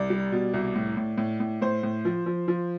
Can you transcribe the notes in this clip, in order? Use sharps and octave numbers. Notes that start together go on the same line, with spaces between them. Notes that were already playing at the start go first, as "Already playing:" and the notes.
Already playing: C2 D5
G3
B2
C2
A2
A2
A2
A2
A2 C5
A2
F3
F3
F3